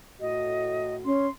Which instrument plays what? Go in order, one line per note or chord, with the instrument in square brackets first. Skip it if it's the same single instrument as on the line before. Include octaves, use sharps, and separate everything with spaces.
[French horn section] A2 F#4 [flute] D#5
[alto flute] C#4 [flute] C6